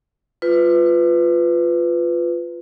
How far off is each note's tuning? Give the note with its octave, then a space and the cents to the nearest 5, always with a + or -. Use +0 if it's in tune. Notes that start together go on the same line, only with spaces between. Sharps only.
F4 +0 B4 +15